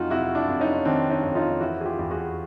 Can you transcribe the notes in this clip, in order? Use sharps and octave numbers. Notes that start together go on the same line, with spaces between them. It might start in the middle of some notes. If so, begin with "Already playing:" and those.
Already playing: F2 F#3 D#4 F4 F#4
C3 E4 F#4
D4 E4
F2
C#4 D#4
D#3 C4 D4
C#4 D#4
F2
D#4 F4
E3 E4 F#4
G#4
F4 G4
E2
F#4 G#4